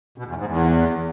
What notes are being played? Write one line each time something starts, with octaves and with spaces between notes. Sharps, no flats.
B2
E2
G#2
E2